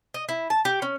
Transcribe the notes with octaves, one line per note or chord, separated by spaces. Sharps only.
D#5
E4
A5
G4
C#4